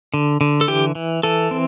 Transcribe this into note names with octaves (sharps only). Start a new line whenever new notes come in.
D3
D3
A4
E3 G4
E3
E3 A4
C4